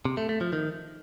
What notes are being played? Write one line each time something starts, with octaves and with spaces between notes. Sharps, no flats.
C3
A3
A3
F3
D#3